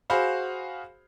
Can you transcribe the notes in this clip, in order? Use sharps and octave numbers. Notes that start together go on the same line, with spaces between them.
F#4 G#4 C5 F5 B5